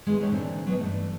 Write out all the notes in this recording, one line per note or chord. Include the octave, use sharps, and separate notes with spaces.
D#3 G#3 B3 E4
D#2 D3 D#3 G4 A4 C#5
A#2 D3 E3 A#3 C4 D4
F#3 G3 B3 C#4 D#4 D#5
G2 E3 A3